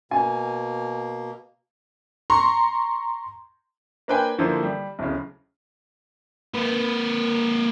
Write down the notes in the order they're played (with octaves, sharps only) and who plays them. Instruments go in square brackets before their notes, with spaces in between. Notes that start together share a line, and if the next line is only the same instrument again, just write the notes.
[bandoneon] B2 A#3 [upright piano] G#5
[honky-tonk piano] A#5 C6 C#6
[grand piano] A#3 D4 B4 C5 G5 G#5
D3 E3 F3 A#3 A4 C5
G3
D1 C#3
[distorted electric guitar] A#3 B4